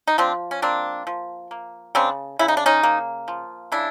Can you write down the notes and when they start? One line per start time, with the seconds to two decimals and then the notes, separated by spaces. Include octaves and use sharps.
0.08 D#4
0.18 F3 C4 D4
0.51 C#4
0.62 A#3 C4 D4
1.07 F3
1.51 A#3
1.95 C#3 C4 D4
2.39 C#3 E4
2.48 D#4
2.57 D4
2.66 C#4 D#4
2.83 A#3
3.28 F3
3.72 C#3 D4 E4